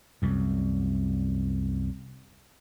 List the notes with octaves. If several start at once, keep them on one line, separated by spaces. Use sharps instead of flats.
C2 F#2